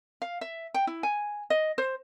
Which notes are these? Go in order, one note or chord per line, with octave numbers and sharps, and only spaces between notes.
F5
E5
G5
E4
G#5
D#5
C5